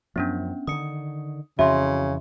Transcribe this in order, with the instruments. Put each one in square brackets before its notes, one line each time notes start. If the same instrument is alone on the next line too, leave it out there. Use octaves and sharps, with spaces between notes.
[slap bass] F#2 F3 [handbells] B3 C#4 D4
[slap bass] D3 D#3 [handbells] D#6 C#7
[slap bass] F2 E3 [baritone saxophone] C#3 [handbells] F#4 [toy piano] E5 C6